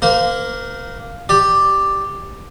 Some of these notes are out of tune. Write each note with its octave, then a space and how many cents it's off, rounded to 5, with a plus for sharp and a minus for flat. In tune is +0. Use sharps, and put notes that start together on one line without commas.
A#3 +0 C5 -35
G4 +0 D5 +5